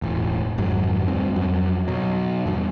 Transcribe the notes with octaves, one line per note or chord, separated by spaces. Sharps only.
E1 A1
G#1 F2 G#2 F#3
D2 G2 C4
F2 F#3
B2 F#3
E2 G2 B2